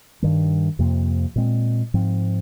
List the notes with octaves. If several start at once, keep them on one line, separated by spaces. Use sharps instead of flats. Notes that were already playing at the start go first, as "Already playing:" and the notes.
G2 D#3 G3
F2 C3 F3 A#3
A#2 G#3 C4
G#2 F3 C4